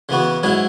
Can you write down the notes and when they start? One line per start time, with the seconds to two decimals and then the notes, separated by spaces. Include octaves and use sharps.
0.09 C#3 E3 B3 F#4
0.43 G#2 F#3 C#4 E4